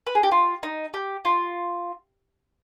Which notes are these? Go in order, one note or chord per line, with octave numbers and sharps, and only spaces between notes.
B4
G#4
G4
F4
D#4
G4
F4